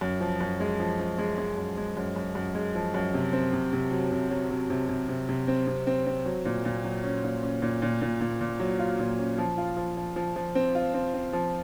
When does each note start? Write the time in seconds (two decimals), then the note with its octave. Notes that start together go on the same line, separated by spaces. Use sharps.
0.01 F#2
0.21 F3
0.40 F#2
0.60 G#3
0.80 F3
0.99 F3
1.18 G#3
1.38 G#3
1.57 F#2
1.77 G#3
1.97 F#2
2.16 F#2
2.35 F#2
2.55 G#3
2.75 F3
2.94 F#2
3.14 C3
3.33 C4
3.53 C3
3.73 C3
3.91 F#3
4.11 C3
4.30 F#3
4.50 C3
4.70 C3
4.89 C3
5.09 C3
5.29 C3
5.48 C4
5.67 C3
5.87 C4
6.07 C4
6.26 F#3
6.45 A#2
6.65 A#2
6.84 F#3
7.04 C#4
7.24 A#2
7.43 C#4
7.62 A#2
7.82 A#2
8.02 A#2
8.21 A#2
8.41 A#2
8.60 F#3
8.79 F4
8.99 A#2
9.19 C#4
9.38 F3
9.58 F4
9.77 F3
9.97 F3
10.16 F3
10.36 F3
10.55 C4
10.75 F4
10.94 C4
11.14 C4
11.33 F3